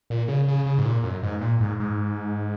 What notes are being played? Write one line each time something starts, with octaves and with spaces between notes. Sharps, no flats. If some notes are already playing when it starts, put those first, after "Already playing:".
A#2
C#3
C#3
C#3
G#2
A#2
F#2
G#2
A#2
G#2
G#2